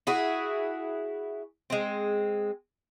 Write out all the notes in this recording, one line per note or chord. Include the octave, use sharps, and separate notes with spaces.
E4 F#4 G#4
G#3 C4